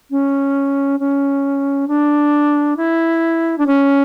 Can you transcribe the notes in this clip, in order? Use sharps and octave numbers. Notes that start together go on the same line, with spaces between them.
C#4
C#4
D4
E4
D4
C#4